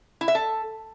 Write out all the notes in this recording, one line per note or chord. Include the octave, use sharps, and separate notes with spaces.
E4
E5
A4